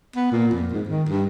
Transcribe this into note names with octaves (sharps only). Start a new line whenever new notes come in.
B3
A#2
F2
G#2
D#3
G2